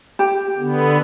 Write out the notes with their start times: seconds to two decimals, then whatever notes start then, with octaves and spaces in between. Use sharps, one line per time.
0.19 G4
0.58 D3 B3